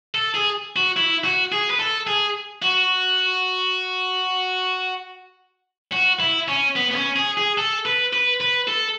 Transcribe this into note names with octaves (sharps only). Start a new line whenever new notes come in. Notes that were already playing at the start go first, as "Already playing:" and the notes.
A4
G#4
F#4
E4
F#4
G#4
B4
A4
G#4
F#4
F#4
E4
C#4
B3
B3
C#4
G#4
G#4
A4
B4
B4
B4
A4